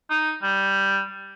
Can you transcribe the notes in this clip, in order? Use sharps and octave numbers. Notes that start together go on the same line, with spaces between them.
D#4
G3